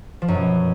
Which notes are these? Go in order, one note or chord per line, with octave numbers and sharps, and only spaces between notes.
F3
F#2
B2